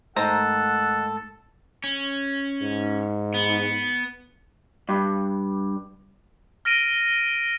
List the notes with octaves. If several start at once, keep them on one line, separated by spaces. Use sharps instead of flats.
G#2 D#3 A3 A4 C5 F#5 A#5 C6
C#4
G#2
B3
G2
F6 A#6 D7 D#7